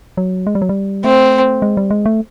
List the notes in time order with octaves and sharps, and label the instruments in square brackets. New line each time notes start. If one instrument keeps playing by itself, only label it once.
[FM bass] F#3
G#3
G3
F#3
G3
[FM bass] A3 [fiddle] C4
[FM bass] G#3
G3
G#3
A3